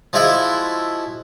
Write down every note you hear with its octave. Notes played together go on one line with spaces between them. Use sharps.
F3 G#3 E4 F#4 E5